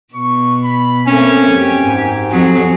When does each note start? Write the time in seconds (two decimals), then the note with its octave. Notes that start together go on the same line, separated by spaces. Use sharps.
0.14 B2 C#6
0.64 B5
1.07 A3 A#3 C4 C#4 G#5
1.49 F#2 G4
1.82 G#2
2.31 F2 F#3 G#4